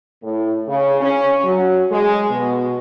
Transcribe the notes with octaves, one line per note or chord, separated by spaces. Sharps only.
A2
C#3
C#4
F#3
G#3
B2